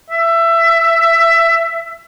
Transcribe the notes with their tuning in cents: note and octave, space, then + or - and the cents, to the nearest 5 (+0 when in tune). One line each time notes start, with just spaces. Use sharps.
E5 +20